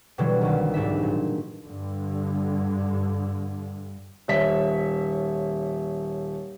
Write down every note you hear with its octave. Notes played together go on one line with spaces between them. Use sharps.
B2 D3 E3 F#3 G3
C2 D#3
C2 G#2 D4 E5
A#2
G2 D3
D#1 C#5 E5 B6